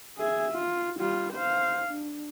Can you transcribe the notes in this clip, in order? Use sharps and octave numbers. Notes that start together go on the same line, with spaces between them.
G#4 E5
F4
G3 F4
C5 F5
D4